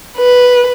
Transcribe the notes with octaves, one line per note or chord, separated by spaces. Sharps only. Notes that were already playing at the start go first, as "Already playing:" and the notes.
B4